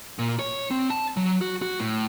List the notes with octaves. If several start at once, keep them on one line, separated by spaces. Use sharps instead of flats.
A#2
C#5
C4
A5
F#3
F#4
F#4
A2